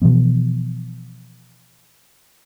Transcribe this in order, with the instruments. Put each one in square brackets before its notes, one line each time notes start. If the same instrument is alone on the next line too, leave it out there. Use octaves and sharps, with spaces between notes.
[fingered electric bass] B2 E3 F3 B3